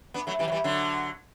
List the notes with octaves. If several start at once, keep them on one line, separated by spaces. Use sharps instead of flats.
B3 D4
F#3 A3
E3 G3
F#3
E3 G3
D3 F#3